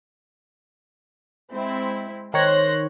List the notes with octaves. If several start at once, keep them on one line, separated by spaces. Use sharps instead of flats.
G#3 C4 E4
D#3 C5 C#5 F#6 A#6